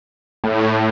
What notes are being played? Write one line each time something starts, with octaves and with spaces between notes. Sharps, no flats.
A2